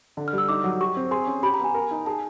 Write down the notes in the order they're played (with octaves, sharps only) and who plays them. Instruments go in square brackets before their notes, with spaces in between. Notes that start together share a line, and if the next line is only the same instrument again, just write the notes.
[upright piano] D3
[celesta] F6
[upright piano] G3
[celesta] E6
[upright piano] D#4 [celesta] D6
[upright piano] F#3
[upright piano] G4 [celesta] C#6
[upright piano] C4
[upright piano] G#4 [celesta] C6
[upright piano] C#4
[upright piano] G4 [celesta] B5
[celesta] A#5
[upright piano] B3 [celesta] G#5
[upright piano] A#4
D#4
[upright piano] G#4 [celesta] A5